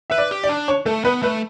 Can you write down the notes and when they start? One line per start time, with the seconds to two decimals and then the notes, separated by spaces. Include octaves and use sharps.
0.10 B4 E5
0.18 D5
0.31 G4
0.43 D5
0.49 D4
0.68 C#5
0.86 A3 A4
1.04 B3 B4
1.22 A3 B4